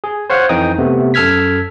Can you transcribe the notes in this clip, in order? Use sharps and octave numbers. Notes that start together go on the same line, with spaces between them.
G#4
C5 C#5 F5 F#5
F2 E3 D#4 G5 D#6
C3 A3 B3
F#2 A4 E6 F6 G#6 B6